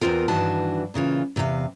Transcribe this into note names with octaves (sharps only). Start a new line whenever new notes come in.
E2 B3 C4 F4 A#4
G2 D#3 E3 D4 F#4 A5
A#2 C#3 E3 F4
E2 C3 E3 A4 F5